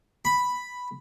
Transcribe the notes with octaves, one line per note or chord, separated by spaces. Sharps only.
B5